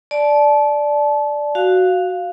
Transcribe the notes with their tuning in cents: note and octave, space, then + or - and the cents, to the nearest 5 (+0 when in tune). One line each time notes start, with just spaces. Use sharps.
D5 +0 A5 -25
F#4 +0 F5 +0